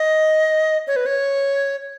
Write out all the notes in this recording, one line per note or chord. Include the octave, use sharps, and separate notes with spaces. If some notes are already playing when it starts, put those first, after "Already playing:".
Already playing: D#5
C#5
B4
C#5